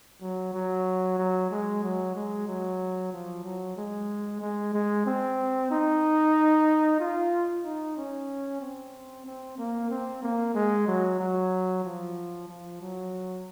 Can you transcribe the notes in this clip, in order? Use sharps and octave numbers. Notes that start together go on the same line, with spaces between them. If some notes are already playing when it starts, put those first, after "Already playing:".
F#3
F#3
F#3
G#3
F#3
G#3
F#3
F3
F#3
G#3
G#3
G#3
C4
D#4
F4
D#4
C#4
C4
C4
A#3
C4
A#3
G#3
F#3
F#3
F3
F3
F#3